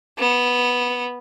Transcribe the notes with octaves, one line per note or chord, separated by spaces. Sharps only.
B3